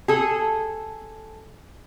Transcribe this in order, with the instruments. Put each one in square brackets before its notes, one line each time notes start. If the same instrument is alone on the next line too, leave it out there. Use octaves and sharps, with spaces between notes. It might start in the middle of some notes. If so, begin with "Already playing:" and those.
[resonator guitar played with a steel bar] G#4 A4